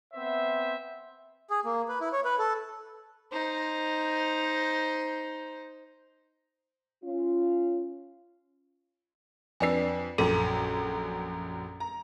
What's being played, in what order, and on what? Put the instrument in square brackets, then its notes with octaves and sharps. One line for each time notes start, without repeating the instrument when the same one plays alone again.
[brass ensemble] B3 C4 C5 E5
[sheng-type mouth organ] G#4
A#3
B4
E4
C#5
B4
A4
[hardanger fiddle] D#4 C5
[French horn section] C#4 F4
[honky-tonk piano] F2 D4 C7 [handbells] B4 G#5
[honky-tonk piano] A#1 F#2 [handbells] A4
[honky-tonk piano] A#5